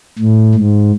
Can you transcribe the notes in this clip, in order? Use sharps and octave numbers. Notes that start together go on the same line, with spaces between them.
A2
G#2